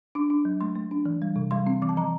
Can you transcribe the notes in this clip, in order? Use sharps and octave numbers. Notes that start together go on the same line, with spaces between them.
D4 D6
D4
F#3
A3 C6
A3
D4
E3
G3
C3
G3 C6
C4
E3 D6
A5
F3 A#5